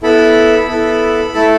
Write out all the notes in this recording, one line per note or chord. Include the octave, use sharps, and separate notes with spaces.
B3 E4 A4 B5
B3 E4 A4
A3 E4 A4 A5